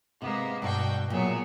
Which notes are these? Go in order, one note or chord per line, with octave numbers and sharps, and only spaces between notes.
C3 G#3 A#3 B3
G2 B2 F#4 D5 G5
A#2 F#3 B3 G#4 E5